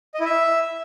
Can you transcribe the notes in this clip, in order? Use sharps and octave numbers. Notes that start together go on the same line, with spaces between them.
D#5
E4
E5